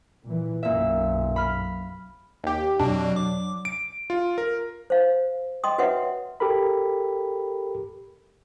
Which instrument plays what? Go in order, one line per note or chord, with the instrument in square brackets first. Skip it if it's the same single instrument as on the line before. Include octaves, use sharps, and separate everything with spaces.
[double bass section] A#2 E3
[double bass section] B1 F#2 [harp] A#2 E5
[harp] B5 F6
[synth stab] D#2 G4
[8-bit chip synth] F2 B2 [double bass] F#3 [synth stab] D4
[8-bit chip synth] D6
[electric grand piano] D7
F4
A#4
[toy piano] C5 F5
D#5 G5 C6 D#6
F#4 B4 C#5 E5 F#5
[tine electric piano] G4 A4 A#4 B5